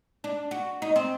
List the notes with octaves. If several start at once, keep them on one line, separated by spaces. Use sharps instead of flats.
D4
F#4
D#4
C4